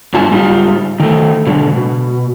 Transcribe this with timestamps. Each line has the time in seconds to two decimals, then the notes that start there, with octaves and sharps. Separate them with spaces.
0.14 G2 G#3 F4 G#5 A5
0.31 G#2 G3 A3 C4 D#4 F4
1.00 D#3 A3
1.46 G#2 B2 D3 G#3
1.76 B2